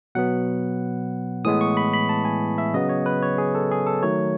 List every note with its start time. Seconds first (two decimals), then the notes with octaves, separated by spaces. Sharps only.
0.15 B2 F#3 B3 F#5
1.45 A2 E3 G#3 B3 D#6
1.61 C#6
1.77 B5
1.93 B5
2.09 A5
2.25 G#5
2.58 E5
2.74 C#3 F#3 B3 D#5
2.89 C#5
3.06 B4
3.22 C#5
3.38 G#4
3.55 A4
3.71 G#4
3.87 A4
4.03 D#3 F#3 A3 C#5